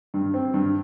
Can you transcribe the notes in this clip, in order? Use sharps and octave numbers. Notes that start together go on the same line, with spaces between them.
G2
C4
G2